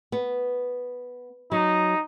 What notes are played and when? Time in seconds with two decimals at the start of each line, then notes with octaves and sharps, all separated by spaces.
0.12 B3
1.52 F#3 D#4